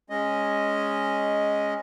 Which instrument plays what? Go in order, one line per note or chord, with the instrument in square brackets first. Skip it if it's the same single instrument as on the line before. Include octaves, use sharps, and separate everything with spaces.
[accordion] G#3 C#4 D#5